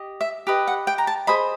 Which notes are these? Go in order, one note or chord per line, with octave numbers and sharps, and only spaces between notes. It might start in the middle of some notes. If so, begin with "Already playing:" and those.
Already playing: G4 D#5
E5
G4 B4 D#5
F#5
G5
A#5
A5
G#4 C5 D#5 B5